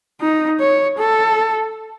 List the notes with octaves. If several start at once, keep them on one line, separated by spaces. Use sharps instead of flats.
D#4
C#5
A4